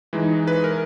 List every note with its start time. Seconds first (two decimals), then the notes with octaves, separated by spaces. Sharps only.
0.13 E3 G#3 D#4
0.47 B4
0.64 A#4